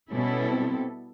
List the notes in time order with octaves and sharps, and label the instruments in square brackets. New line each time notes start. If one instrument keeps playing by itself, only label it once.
[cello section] B2 G3 B3 E4 A4 [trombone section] C#4
[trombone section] C4